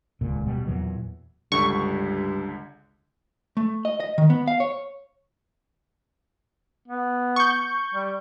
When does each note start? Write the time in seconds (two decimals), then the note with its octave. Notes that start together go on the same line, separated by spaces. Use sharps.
0.21 D#1 C#2 A#2
0.46 B2 G3
0.66 E2 A#2 E3 F#3
1.52 C#2 G2 D3 C#6
3.57 A3
3.85 D#5
4.00 D#5
4.18 D#3
4.30 B3
4.48 F5
4.60 C#5
6.88 B3
7.36 C#6 G6
7.94 G3